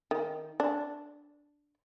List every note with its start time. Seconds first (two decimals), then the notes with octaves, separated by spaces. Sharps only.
0.11 D#3
0.60 D4